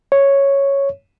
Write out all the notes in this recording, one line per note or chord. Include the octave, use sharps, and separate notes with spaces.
C#5